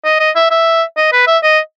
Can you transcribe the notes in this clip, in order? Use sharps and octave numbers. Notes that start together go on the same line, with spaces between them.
D#5
D#5
E5
E5
D#5
B4
E5
D#5